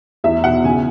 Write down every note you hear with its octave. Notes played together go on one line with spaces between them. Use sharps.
E2 E5
B2 F#5
C#3 G#5